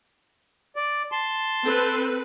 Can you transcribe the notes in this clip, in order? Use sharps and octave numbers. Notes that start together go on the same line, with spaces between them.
D5
A5 C6
C4 A4 B4